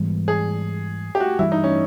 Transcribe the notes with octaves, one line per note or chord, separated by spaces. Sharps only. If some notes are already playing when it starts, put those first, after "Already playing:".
Already playing: G#2 E3 G3 B3
G#4
G4
F#4
G2 E3 G3 E4
D#4
C#4